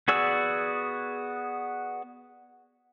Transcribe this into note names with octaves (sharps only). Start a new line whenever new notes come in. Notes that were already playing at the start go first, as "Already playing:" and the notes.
B3 F#4 G#4 D5 E6